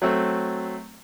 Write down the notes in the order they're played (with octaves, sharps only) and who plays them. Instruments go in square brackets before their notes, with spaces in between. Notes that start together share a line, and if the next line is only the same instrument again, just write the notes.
[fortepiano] F#3 A3 C4